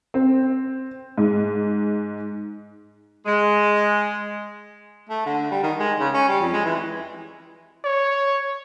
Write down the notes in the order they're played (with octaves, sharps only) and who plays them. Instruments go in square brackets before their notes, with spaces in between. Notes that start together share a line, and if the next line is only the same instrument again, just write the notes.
[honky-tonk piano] C4
G#2
[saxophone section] G#3
[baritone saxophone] A3
D3
G3
D#3
G#3
C#3
C#4
G3
F2
G#3
E3
[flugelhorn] C#5